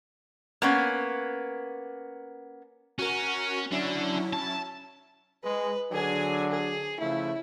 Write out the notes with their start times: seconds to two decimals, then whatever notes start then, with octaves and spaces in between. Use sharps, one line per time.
0.62 A#3 B3 C#4
2.99 C#4 F#4 A#4
3.71 D3 F#3 C#4 D4 E4
4.33 A5
5.44 G#3 B4
5.92 D3 F#3 D4 G#4 G#5
6.51 G#4
7.00 C#3 F3 A3 E4